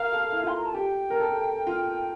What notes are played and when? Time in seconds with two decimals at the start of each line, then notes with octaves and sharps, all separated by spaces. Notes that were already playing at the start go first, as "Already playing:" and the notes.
Already playing: A#4 F5
0.13 A4
0.32 E4
0.43 F4 C6
0.57 A#5
0.65 A5
0.74 G4 G5
1.10 A#4
1.20 A4
1.67 F4